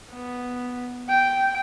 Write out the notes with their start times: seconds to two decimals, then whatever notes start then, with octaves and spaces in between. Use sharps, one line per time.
0.12 B3
1.09 G5